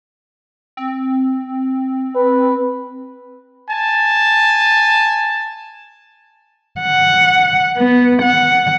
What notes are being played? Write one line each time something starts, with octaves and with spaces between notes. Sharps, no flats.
C4
B4
G#5 A5
F#5
B3
F#5